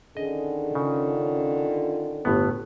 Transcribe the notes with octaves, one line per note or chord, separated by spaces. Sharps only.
D3 D#3 C#4 G#4 D#5
C#3 F4
G1 A2 B3